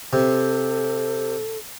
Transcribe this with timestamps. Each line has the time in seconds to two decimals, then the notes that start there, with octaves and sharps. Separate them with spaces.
0.13 C3 A4